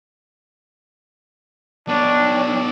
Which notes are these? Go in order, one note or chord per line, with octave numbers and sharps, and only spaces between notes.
B3 D4 C#5